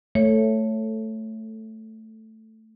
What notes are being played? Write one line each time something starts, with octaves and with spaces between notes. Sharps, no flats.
A3 C#5